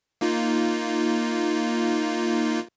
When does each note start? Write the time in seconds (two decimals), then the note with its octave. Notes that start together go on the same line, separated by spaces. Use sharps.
0.21 A#3 D#4 F4